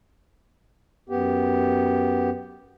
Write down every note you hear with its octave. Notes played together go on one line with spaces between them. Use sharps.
F#2 B3 G4